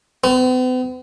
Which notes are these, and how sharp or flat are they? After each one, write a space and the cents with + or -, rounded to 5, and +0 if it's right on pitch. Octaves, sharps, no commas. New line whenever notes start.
B3 +45